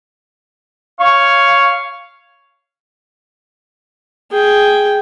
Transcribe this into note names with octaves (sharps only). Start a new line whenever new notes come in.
C#5 F5 C#6
G#4 G5